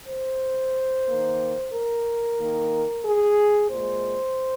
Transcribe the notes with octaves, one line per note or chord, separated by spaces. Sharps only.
C5
D#3 A#3
A#4
D#3 A#3
G#4
A#2 G#3 C5